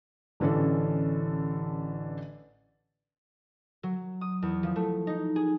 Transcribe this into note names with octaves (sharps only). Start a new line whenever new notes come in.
A1 D3 E3 C#4 A4
F#3
D#6
E2
F3
A3
D#4
G#4